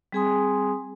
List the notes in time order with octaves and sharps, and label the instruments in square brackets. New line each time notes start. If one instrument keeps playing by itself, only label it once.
[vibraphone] G3 C4 G#4 G#5 C6 D#6